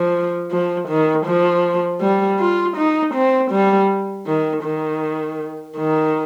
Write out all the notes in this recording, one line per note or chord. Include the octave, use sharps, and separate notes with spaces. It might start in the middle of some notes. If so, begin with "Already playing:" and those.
Already playing: F3
F3
D#3
F3
G3
F4
D#4
C4
G3
D#3
D#3
D#3